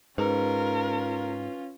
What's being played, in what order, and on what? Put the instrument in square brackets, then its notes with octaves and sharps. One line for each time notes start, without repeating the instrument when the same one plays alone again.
[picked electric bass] G#2 [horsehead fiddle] C#4 F4 [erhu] A#4 [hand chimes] B4